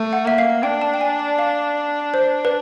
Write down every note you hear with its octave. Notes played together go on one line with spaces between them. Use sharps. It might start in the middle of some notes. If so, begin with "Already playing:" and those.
Already playing: A3
F#5
A#3 E5
F5
D4 G5
A5
G5
G#5
A5
F5
C5
B4